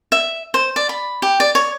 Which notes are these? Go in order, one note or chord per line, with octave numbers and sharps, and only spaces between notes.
E5
C5
D5
B5
G4
D5
C#5